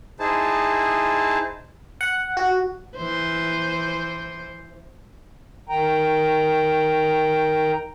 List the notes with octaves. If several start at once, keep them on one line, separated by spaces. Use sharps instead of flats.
D#4 E4 G#4 C5 A5
F#5
F#4
E3 C5
D#3 G5 A#5